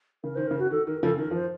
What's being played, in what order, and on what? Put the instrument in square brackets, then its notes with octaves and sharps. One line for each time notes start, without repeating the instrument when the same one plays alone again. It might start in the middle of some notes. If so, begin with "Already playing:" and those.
[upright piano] C#3 [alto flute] A#4
[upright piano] D#3 [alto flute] C5
[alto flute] A#4
[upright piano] C#3
[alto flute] F#4
[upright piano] D#3 [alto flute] A4
[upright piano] D#3 [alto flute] A#4
[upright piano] C#3 F3 [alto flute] A4
[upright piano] D#3 [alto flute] A#4
[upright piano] F3 [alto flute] C5